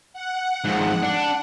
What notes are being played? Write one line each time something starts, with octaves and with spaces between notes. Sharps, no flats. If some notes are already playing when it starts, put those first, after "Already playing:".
F#5
F2 G#2
D4